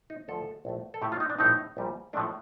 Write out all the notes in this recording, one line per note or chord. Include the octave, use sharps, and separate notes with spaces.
D#4
D2 D3 F3 A3 A4
A#1 A2 A3
A4
A2 A3 C4 G4
F4
D#4
D4
A#1 A2 G3 C4 D#4
A#1 A#2 G3
A2 F3 A3 D4